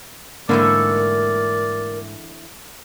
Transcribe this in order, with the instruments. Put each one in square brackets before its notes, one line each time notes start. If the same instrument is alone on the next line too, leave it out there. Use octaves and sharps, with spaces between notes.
[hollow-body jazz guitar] G#2 A#3 D4 [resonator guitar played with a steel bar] D3 E3 A3 [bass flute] A#4 [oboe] D5